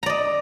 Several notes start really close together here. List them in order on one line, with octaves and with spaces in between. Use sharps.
A#5 D5 D#5